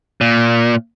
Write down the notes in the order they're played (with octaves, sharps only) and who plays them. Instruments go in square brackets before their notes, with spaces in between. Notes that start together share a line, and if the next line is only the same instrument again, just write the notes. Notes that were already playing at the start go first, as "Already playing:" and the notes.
[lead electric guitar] A#2